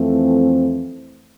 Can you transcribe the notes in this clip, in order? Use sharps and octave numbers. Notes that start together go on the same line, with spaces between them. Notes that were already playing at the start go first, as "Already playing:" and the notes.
Already playing: F2 E3 A3 C4